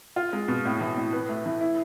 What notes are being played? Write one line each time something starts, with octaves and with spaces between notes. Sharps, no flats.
F4
G#3
B2
A2
E3
A2
B4
A3
E3
E4